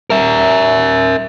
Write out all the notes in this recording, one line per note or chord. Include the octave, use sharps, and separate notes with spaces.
A#4 E5